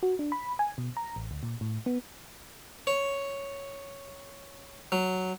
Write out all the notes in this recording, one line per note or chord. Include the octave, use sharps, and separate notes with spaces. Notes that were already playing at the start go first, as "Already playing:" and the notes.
F#4
D4
B5
G#5
B2
A#5
A1
D2
A#2
A2
B3
C#5
F#3